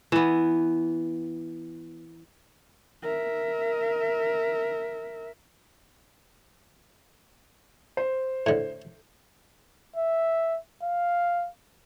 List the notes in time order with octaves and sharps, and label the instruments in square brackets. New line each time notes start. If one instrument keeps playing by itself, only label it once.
[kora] E3 B3
[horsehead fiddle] A#4 E5
[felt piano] C5
[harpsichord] A2 D3
[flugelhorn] E5
F5